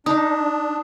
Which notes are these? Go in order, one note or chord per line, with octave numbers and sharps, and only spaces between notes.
D4 D#4 D#6